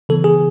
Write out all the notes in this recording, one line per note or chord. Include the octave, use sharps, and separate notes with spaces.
C#3 E3 B3 A4
G#4